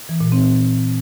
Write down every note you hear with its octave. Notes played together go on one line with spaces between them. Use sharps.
E3
A#2
C4